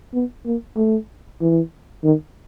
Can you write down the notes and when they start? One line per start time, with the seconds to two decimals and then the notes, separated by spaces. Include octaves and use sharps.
0.14 B3
0.46 A#3
0.77 A3
1.41 E3
2.04 D#3